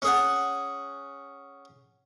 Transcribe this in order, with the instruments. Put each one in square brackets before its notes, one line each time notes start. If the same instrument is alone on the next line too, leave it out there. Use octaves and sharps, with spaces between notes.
[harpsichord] C#4 G#4 F#5